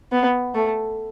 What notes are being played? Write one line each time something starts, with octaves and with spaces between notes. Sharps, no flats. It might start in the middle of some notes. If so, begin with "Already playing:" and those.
B3
A3